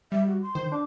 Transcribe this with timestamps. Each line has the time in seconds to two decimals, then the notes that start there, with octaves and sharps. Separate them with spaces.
0.12 G3 E5
0.27 F#4
0.42 C6
0.55 D#3 C5
0.72 D4 D6